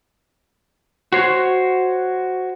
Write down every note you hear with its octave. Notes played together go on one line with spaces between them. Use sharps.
F#4 C5 C#5